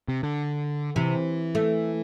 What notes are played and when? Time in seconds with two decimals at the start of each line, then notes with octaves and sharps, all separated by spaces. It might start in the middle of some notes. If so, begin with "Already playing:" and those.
0.08 C3
0.23 D3
0.96 C3 E3
1.55 A3